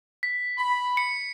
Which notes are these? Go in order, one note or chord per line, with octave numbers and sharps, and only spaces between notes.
B6
B5
C#7